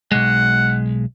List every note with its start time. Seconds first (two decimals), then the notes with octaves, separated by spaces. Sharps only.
0.12 B1 G#3 F#5